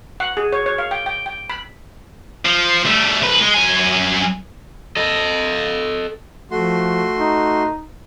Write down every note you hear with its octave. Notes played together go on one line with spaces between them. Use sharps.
F#5
G#4
C#5
C#5
F5
G5
G5
G5
B5
F3
G3 A3
C2 B4
G#3
F#2 G#5
A4 D#5
F3 A3 F#4 C6
D#4